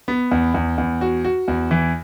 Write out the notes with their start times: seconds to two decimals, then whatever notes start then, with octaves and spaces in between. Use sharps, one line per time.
0.08 B3
0.31 E2
0.54 E2
0.78 E2
1.01 F#4
1.25 F#4
1.48 E2
1.71 E3